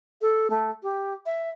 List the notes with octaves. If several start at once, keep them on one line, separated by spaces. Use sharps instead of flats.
A4
A3
G4
E5